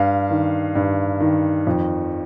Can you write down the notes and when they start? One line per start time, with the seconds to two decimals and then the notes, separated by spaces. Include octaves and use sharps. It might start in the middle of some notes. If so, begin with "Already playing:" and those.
Already playing: G2 F5
0.30 D#3
0.75 G2
1.20 D#3
1.67 F2